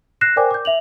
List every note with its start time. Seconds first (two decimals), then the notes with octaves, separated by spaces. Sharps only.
0.21 F#6 A#6 C7 E7
0.36 A#4 C5 D5 G5 G#5 D6
0.51 D6 G6
0.65 E5 F7 F#7